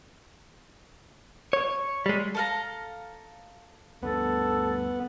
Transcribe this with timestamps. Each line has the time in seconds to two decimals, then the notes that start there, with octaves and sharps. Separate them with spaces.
1.53 C#5
2.06 G3 G#3
2.35 A4 F5 A#5
4.03 D2 G2 B3 A4